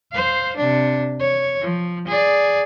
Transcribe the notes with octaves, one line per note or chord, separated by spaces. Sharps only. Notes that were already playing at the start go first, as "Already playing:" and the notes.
C5 F5
C3 D4
C#5
F3
G#4 D5